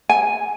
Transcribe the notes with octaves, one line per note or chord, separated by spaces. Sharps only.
G#5